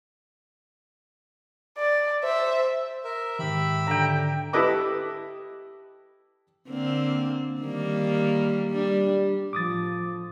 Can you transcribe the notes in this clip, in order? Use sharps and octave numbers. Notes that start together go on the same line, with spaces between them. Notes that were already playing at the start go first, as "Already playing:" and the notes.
D5
C5 E5
A#4 E5
G#2 D#3 G4 E5 B5
D3 G5 A#5
E4 G4 A4 B4 D#5 D6
D3 A#3 C4
D#3 G3 A#3
G3 D4
A2 F3 D6 D#6 A6